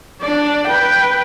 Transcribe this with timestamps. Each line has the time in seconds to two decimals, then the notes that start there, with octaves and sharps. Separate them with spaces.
0.21 D4 D5
0.67 B4 G5